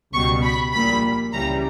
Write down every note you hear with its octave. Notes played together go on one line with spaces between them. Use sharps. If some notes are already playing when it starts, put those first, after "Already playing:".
C#2 B2 G3 C#6
B5
A#1 A#2 G3 B5
C#2 C#3 E3 G3 A#5